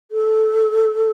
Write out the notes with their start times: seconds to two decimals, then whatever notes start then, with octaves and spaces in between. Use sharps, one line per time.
0.11 A4